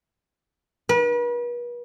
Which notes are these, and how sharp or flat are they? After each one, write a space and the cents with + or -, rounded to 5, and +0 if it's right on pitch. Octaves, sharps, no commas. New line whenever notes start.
B4 -40